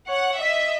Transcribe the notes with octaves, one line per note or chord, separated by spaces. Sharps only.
C#5 F#5
D#5 E5